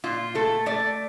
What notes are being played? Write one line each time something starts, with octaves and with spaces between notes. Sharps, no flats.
A#2 F4
A3 A4
A3 D5